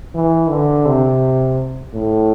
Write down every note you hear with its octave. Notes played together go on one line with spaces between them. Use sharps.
E3
D3
C3
A2